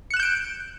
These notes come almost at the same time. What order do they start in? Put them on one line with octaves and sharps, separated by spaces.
C#7 F#6 E7 G6 D7